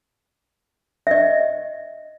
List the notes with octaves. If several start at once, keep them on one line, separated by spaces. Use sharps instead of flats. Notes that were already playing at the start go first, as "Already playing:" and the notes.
D#5 E5